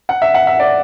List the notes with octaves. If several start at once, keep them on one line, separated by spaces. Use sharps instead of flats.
F#5
E5
F#5
E5
D5